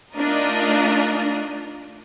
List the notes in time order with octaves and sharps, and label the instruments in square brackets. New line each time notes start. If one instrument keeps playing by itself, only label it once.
[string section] A3 D4 D#4 F4 A#4 D#5